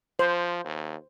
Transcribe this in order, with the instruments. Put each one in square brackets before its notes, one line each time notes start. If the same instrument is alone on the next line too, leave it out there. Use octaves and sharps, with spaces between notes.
[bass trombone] F3 [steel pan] C5
[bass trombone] D#2